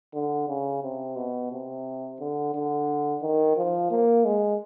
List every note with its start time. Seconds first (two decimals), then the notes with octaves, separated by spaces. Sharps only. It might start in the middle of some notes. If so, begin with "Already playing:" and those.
0.14 D3
0.48 C#3
0.83 C3
1.16 B2
1.51 C3
2.20 D3
2.54 D3
3.22 D#3
3.57 F3
3.91 A#3
4.25 G#3